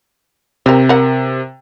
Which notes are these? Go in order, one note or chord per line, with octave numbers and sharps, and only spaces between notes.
C3 C4 A#4
A#4 F#5